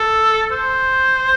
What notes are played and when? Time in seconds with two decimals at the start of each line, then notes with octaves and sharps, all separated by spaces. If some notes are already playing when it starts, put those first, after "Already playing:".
Already playing: A4
0.51 C5